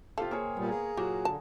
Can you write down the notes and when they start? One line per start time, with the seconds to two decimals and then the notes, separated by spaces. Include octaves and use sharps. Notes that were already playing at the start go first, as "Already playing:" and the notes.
0.18 C3 C4 F4 G4 A4 F5
0.31 A#3 G#4 C#5
0.57 A#2 G3 B3
0.69 G#4 A#4 F5
0.97 A#2 F#3 F#4 G4
1.25 D3 A5